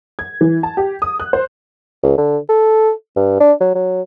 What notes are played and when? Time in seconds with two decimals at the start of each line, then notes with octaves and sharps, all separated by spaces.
0.19 G#6
0.41 E3
0.63 A5
0.77 G4
1.02 D#6
1.20 F#6
1.33 C5
2.03 C#2
2.17 D3
2.49 A4
3.16 G2
3.40 D4
3.60 F#3
3.75 F#3